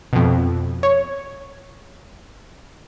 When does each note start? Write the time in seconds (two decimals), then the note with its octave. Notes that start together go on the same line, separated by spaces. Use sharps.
0.13 F2 B2
0.83 C#5